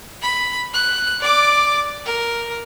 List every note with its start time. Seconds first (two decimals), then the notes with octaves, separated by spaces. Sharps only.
0.22 B5
0.74 F#6
1.21 D5 D6
2.05 A#4